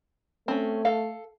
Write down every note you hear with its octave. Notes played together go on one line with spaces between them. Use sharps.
A3 C4 C#4
A4 F5